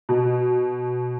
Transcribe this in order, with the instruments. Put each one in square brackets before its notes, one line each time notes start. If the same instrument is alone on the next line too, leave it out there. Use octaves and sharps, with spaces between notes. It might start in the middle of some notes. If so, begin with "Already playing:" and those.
[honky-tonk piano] B2